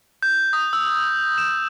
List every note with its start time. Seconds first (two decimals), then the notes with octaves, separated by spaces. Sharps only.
0.23 G6
0.53 D#6
0.73 E6
0.87 E6
1.38 E7